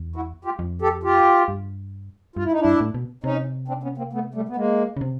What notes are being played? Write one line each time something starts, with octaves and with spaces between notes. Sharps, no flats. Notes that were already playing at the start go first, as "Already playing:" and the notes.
Already playing: E2
E4 F#4
F4 G4
F2
G4 A4
F4 G4
G2
G2 F4
E4
D#4
G2 D4 E4
A2
B2
C3 C#4 D#4
C4 D4
B3 C#4
A#3 C4
A3 B3
G3 A3
B3
G#3 A#3
C#3
C3